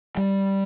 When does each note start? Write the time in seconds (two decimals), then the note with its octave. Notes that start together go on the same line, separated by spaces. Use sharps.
0.17 G3